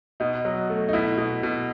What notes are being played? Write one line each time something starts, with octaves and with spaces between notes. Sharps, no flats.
B2 D#4
F#3
A3
D#4
B2 E4
B2
B2